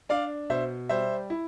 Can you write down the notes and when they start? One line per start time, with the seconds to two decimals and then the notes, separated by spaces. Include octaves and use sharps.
0.09 D4 D5 F5
0.50 B2 C5 E5
0.89 G3 C5 E5
1.30 E4